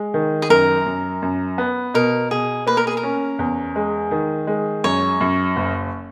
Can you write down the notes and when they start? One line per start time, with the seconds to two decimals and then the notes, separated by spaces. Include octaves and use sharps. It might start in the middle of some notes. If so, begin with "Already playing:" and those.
Already playing: G#3
0.14 D#3
0.42 G#4
0.50 F#2 A#4
0.86 F#2
1.22 F#2
1.58 B3
1.94 B2 A#4
2.31 B2 G#4
2.67 A#3 B4
2.77 A#4
2.87 G#4
2.97 A#4
3.03 C#4
3.39 E2
3.76 G#3
4.11 D#3
4.47 G#3
4.84 F#2 C#5
5.21 F#2
5.56 F#1